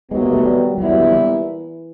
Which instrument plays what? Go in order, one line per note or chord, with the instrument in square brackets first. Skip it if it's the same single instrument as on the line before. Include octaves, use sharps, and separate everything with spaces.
[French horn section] C3 D#3 F#3 B3 [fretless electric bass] G#3
[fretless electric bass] A#3
A3
G3
[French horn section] A#2 G3 B3 E4 [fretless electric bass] F#3
[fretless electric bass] F#3
D3
E3